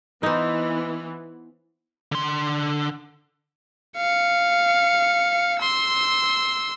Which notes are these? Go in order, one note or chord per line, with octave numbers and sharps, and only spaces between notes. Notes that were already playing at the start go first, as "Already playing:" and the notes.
E3 B3 D#4 C5
D3 C6
F5 C#7
C6 E6